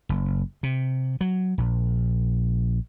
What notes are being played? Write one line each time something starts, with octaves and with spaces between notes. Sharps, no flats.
F#1
C3
F#3
A#1